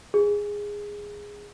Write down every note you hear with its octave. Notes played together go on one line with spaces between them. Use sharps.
G#4